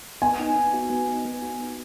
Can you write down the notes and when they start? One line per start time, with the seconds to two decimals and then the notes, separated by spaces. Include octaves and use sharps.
0.22 B3 G#5
0.40 D#4
0.56 B3
0.73 F#4
0.90 B3
1.08 D#4
1.25 B3
1.42 F#4
1.60 B3